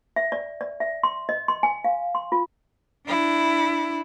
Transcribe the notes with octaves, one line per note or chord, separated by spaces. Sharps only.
E5
D5
D5
E5
C6
D#5
C6
G#5
F5
C6
F4
D4 E4